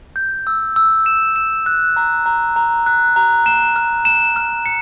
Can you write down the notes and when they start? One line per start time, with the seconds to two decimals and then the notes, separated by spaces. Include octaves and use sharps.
0.16 G6
0.47 E6
0.76 E6
1.06 E7
1.36 E7
1.66 F#6
1.96 A#5
2.26 A#5
2.56 A#5
2.86 F#6
3.16 A#5
3.46 E7
3.76 F6
4.05 E7
4.36 F6
4.66 C#7